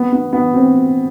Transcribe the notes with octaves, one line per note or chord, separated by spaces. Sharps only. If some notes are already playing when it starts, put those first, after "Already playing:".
Already playing: B3
B3
B3
C4